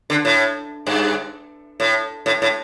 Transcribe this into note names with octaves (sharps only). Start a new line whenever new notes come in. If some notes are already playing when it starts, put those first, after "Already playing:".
D3
A2
G2
A2
A2
A2